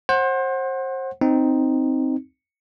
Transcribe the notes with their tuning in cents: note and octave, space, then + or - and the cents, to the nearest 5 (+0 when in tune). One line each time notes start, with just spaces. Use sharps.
C5 +30 F#5 +0
C4 +0 D#4 +0